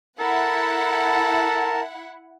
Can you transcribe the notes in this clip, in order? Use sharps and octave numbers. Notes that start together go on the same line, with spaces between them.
E4 A4 A#4 F#5 A5